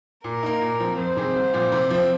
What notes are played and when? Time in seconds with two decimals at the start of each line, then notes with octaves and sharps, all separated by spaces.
0.24 A#2 A#4
0.43 A#3 D#4
0.61 A#2
0.80 F3 C4
0.98 F2 C5
1.17 C3 D#3 C4 G#4
1.36 C2
1.53 A#2 F3 C4 F4
1.72 C3
1.90 F3 C4